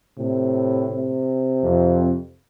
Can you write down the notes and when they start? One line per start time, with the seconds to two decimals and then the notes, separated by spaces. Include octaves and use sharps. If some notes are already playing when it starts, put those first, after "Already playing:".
0.18 A2 C3
0.90 C3
1.63 F2